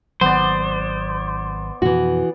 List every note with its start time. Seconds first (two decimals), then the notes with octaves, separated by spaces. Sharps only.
0.21 G#1 D#3 F#3 B3 C5 D5
1.82 F2 B2 E3 F#4